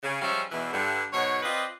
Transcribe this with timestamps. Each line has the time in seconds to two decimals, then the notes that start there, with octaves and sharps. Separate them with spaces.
0.03 C#3
0.22 F3 G3 G#3 C#4 E5 F5
0.52 E2 B2 E3
0.73 G2 D3
1.13 G#2 B2 F#3 G#3 C#5
1.43 C4 F4 B4 D5 D#5